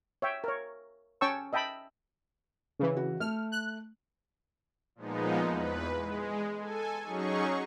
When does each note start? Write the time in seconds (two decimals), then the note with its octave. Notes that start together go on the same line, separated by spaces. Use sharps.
0.22 C#5 E5 G5
0.44 A#4 C#5
1.21 C#4 C#5 G5 A5 C#6 E6
1.53 D#5 E5 G5 A5 B5
2.79 C#3 E3
2.97 F#4
3.20 A3 F6
3.52 F#6
4.96 A#2 F3 G#3 B3 D#4
5.45 E2 B4
5.97 G#3
6.59 A4 G#5
7.03 F#3 C#4 D#4 G#4 C#6